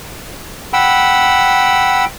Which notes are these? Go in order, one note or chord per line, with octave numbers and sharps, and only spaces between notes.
F#5 G5 B5 E6